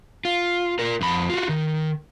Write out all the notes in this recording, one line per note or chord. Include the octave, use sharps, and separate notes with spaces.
F4
F4 A#4
F2 B5
F4 F#4
D#3